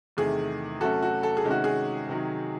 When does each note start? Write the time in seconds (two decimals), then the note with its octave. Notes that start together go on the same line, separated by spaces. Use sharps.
0.17 E2 C3 D#3 A3 G#4
0.81 C3 F#3 A3 C#4 F#4 A4
1.02 F#4
1.23 A4
1.37 G#4
1.44 C3 D#3 G#3 C#4
1.51 F#4
1.64 G#4
2.09 C3 D#3 F#3